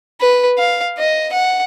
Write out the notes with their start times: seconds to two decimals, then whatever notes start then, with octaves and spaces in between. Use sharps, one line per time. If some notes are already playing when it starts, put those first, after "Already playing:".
0.21 B4
0.58 F5
0.98 D#5
1.32 F#5